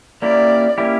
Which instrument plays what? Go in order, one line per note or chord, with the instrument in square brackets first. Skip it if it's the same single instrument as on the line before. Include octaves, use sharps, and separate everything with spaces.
[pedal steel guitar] A#3 C#4 E4 G4 [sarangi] D5
[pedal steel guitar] A#3 C#4 E4 G4